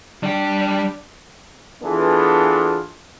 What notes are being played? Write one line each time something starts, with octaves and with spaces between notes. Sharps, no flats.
G3 D4 G5
E3 B3 D4 F4 G#4 A4